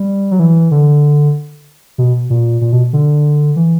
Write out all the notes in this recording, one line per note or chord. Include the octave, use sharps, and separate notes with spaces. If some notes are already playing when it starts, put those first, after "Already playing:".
Already playing: G3
F#3
E3
D3
B2
A#2
A#2
B2
D3
E3